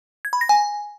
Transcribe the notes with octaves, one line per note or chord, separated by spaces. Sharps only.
G#6
B5
A#6
G#5